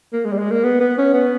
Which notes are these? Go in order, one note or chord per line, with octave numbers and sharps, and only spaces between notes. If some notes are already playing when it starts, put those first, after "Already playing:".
A#3
G#3
G3
G#3
A#3
B3
B3
C#4
B3